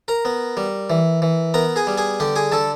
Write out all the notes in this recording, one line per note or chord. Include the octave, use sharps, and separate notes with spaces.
A#4 A#5
B3
G3
E3
E3
B3 A#4 A#5
G#4 G#5
G3
G#4 G#5
D3 G4 G5
G#4 G#5
D3 A4 A5